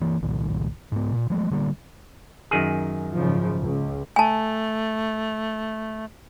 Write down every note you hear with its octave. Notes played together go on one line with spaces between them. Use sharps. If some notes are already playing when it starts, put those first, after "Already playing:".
E3 A#3
F#1 C2 A#2 D#3
G#2 B3
A#2
F3 G#3 A3
D3 G3 A#3
F#2 D#3 G#4
G#2 C#3 F3
C#2
A3 G#5 A5